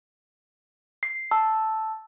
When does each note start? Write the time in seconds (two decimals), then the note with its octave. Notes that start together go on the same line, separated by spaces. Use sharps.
1.03 C7
1.31 A5 E6